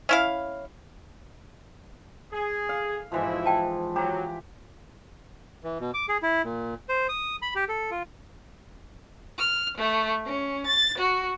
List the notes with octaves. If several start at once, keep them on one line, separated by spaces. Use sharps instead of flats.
C#4 E4 F5
G#4
F5
G#2 B2 E3 F3 E4
G5 A5
F#3 G4 A#5
E3
B2
D6
G#4
E4
A#2
C5
D#6
B5
G4
A4
F4
F6
A3
C#4
A6
F#4